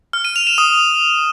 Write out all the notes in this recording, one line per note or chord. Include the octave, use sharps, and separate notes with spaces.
F6
D#7
F7
E7
D#6